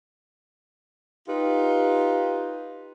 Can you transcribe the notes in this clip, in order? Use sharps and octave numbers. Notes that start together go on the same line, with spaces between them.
D#4 F4 G4 B4